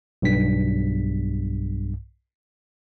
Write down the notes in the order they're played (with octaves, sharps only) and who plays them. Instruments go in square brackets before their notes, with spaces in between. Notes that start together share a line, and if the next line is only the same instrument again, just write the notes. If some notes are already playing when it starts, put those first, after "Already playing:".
[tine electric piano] B1 G2 B6